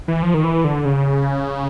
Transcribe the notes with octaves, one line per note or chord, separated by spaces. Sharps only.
E3
F3
D#3
E3
D3
C#3